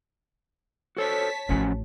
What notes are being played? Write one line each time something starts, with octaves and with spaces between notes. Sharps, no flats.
F#4 A4 C5 C#5 A5 B6
A1 A2 F3 C#4 F#4